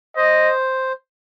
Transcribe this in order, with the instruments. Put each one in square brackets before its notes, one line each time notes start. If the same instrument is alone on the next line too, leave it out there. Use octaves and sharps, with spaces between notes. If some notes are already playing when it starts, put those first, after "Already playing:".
[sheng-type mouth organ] C5 [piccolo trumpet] D#5